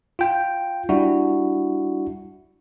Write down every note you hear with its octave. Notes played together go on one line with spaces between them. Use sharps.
F4 G5
G3 D4 E4 F#4